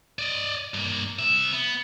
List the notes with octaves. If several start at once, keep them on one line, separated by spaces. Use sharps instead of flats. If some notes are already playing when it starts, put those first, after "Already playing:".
D5 D#5
G2 A#3
C2 E5
B3